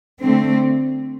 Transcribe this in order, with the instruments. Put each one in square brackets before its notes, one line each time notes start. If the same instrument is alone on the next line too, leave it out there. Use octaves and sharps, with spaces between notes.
[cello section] D3 A3 C4